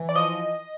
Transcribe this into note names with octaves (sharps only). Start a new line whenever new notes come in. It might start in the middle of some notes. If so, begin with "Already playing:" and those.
Already playing: E3
D5
F3 D#5